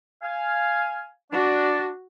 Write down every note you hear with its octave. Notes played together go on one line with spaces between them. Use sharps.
F5 G#5
D4 F#4